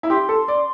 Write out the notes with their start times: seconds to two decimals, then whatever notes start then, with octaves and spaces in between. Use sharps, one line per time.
0.03 E4
0.10 G4 C6
0.29 A4
0.48 D5